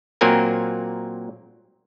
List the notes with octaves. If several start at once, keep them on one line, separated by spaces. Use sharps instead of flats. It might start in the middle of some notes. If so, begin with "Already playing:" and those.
A#2 F#3 A#3 C4 A#4 G#5